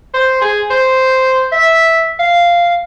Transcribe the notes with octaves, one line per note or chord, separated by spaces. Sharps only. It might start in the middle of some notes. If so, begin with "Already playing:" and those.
C5
G#4
C5
E5
F5